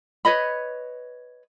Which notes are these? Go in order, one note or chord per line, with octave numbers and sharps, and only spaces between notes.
B4 C#5 D#5 B5